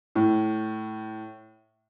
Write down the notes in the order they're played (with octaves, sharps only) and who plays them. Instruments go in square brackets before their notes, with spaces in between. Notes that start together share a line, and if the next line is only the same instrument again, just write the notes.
[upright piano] A2